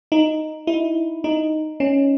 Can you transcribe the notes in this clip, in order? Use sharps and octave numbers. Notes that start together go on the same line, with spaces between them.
D#4
E4
D#4
C#4